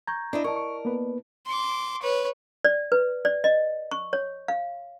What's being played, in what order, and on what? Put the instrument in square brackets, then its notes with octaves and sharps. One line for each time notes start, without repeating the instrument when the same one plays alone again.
[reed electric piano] A#5 [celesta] C#6 G6 G#6
[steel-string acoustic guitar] D4 E4 D#5
[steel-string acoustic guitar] A#4 [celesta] D5 D#5 A5 [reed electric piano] C#6
[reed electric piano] C#6
A#3 B3 B4
[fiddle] C6 D6
B4 C#5
[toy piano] D5
B4
D5
D#5
C#6
C#5
F5